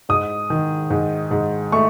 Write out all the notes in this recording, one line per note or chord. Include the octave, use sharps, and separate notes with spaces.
G#2 D#6
D#3
G#2
G#2
A3 C#6